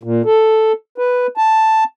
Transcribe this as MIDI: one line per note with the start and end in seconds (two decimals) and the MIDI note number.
0.03 0.22 46
0.25 0.72 69
0.98 1.27 71
1.37 1.84 81